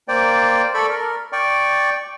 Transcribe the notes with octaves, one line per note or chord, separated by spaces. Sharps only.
A#3 C5 D5 G5
A4 D5 B5 C#6
A#4
D5 G5 C#6